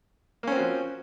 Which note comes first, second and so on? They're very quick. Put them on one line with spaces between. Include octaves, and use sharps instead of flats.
A#3 C#4 C4 F#4 F3